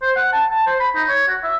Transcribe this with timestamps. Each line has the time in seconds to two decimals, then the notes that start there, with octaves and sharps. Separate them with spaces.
0.02 C5
0.16 F#5
0.32 A5
0.50 A5
0.66 C5
0.80 B5
0.95 D#4
1.09 C#5
1.28 F#4
1.43 E5